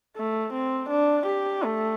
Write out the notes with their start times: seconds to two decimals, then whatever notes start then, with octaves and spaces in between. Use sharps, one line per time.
0.17 A3
0.54 C4
0.90 D4
1.27 G4
1.63 A3